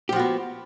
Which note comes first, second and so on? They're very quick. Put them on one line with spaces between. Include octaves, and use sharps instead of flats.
G4 F3 F#4 B3